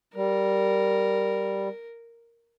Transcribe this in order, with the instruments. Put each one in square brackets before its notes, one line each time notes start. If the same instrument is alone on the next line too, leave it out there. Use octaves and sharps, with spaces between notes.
[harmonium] G3 [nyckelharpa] A#4